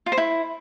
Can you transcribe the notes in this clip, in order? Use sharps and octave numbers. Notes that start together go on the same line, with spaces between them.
F4
C5
E4